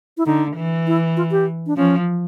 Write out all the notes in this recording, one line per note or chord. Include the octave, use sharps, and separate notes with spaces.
E4
D3 D#4
E3
E4
F4
G4
D4
F3 C#4